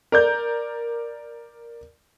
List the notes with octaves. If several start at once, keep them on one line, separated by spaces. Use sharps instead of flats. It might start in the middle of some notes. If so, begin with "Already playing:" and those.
A#4 D5 G6